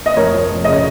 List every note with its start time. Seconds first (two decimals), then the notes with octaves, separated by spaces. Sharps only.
0.06 D#5
0.17 F2 A#4 C#5
0.33 F3
0.50 F2
0.64 C#3 D#5
0.73 C#5